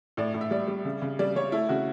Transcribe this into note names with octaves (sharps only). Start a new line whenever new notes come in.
A2 D5
A2
E5
G3 D5
G3
C#3
C#3
G3 D5
G3 C#5
A3 E4
C#3 F#4